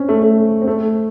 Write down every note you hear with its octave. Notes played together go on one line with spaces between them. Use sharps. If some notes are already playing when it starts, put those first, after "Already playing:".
Already playing: C4 C#4
A3
A3
C4
A3